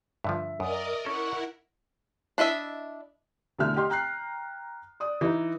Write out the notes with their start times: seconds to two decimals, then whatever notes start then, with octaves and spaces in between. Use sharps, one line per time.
0.24 G2 D3 F3 E5
0.60 F#2 A#4 D5 D#5 D#6
1.05 C#4 E4 A4 A#4 F#5 C#6
2.38 D4 E4 D#5 E5
3.59 E2 B2 D3 A3 E5 F6
3.76 G4 D#5 C6
3.90 G5 A#5 F#6 C7
5.00 D5 D#6
5.21 E3 D#4